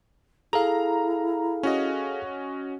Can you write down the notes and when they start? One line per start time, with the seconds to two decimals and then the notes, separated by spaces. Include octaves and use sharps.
0.53 E4 G#4 A4 F5 A#5
1.63 C#4 F#4 D#5